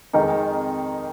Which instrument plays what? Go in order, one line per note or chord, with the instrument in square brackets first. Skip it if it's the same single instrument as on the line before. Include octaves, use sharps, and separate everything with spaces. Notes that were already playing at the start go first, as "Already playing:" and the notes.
[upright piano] F2 D#3 G#3 D#4 A#4